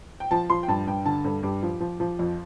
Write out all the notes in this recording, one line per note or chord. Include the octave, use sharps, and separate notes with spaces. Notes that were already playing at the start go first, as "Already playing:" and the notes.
G5
F3 A5
F3 C6
G5
G2 A5
G2 G5
D3 A5
G2 A4
G2 G4
F3
F3
F3
F2